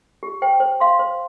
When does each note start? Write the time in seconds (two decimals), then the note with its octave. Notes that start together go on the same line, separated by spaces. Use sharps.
0.23 G4
0.42 C5 G5
0.60 C5
0.80 F5 C6
0.99 C5